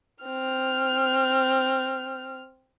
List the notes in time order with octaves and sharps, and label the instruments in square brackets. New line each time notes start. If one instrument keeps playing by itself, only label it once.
[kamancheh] C4 F6